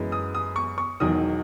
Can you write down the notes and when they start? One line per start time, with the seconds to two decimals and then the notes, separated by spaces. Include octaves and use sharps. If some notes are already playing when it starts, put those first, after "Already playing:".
Already playing: F#2 E3 G#3 B3
0.12 D#6
0.35 D#6
0.56 C#6
0.78 C#6
1.00 E1 E2 D#3 F#3 D#6